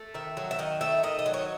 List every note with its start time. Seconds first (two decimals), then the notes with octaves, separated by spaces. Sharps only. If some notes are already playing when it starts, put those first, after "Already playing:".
Already playing: A3
0.14 D#3 E5
0.37 F#3
0.51 E5
0.59 D#3 D#5
0.81 A3 E5
1.03 D#3 D#5
1.19 D#5
1.26 F#3
1.34 C#5